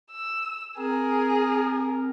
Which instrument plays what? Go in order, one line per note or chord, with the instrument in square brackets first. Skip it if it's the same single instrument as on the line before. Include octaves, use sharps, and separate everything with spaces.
[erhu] E6
[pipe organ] C4 [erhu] G#4 [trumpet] A#4